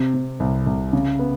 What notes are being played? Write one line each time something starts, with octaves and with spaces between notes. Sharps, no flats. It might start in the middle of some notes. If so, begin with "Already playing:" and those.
Already playing: C3
C3
C2
C2
C#3
B3